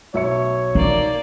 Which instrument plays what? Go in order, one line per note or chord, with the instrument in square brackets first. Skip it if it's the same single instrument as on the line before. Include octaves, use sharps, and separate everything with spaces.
[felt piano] B1 E5 C#7 [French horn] C#5
[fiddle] A#3 D5 [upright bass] D#4